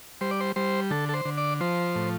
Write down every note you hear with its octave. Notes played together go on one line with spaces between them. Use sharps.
G3 C5
D5
C5
G3 C5
D3 A4
A4
C5
D3
D5
F3 C5
A2